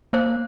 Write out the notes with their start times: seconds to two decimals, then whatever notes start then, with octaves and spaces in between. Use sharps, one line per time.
0.13 A#3 C5